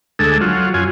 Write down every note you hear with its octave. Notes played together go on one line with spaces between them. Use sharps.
D2 G#3 A4
F#3 F4
F#2 F4 G#5